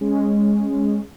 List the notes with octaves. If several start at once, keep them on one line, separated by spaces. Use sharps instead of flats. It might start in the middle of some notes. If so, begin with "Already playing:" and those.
G#3 C#4